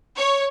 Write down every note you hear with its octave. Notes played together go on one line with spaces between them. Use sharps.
C#5